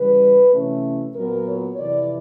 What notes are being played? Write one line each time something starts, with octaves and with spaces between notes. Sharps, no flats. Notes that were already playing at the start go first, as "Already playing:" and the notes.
Already playing: C#3 E3 G3 B4
C3 E3 A3 C#4
A#2 F#3 B3 A#4
C#5
F2 C3 E3 D5